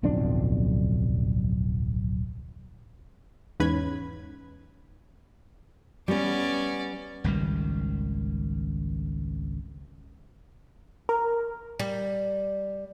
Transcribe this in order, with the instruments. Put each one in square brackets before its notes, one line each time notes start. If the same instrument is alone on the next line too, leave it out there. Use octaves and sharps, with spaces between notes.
[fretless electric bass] D1 B1 F2 D4
[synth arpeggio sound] E2 G#2 C#4 B4 B5 G#6
[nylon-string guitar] G3 B3 [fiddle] C#4 D5
[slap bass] G#1 C#2 D#3 G3
[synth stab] A#4
[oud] G3